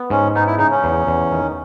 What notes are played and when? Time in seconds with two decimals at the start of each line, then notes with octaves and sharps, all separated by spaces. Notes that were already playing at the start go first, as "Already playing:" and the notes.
Already playing: B3
0.10 G#2 C#4
0.35 B3 D#4
0.47 E4
0.59 C#3 D#4
0.71 C#4
0.84 E2
1.07 E2
1.32 D#3